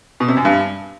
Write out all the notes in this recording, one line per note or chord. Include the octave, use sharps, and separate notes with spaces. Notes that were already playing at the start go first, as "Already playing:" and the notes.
B2
C3
F#2
G2